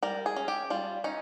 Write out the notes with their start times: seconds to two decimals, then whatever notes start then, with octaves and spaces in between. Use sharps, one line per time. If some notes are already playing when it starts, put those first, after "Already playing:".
0.03 G3 A#4
0.26 G#4
0.36 C#4
0.48 G4
0.70 G3 F4
1.04 C#4 D#4